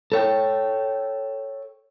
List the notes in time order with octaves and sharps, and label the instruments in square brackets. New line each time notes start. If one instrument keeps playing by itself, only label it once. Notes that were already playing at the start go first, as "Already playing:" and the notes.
[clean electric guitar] A4 C#5 G5